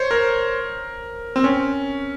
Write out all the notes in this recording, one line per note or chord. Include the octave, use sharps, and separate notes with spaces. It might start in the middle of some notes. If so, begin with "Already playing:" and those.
Already playing: C5 C#5
A#4
C4
C#4